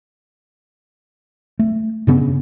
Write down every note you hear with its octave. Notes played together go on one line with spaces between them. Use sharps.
A3
G2 C#3 B3 C#4